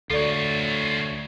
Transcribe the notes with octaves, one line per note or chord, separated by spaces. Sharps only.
D2 F4 A4 C#5 D5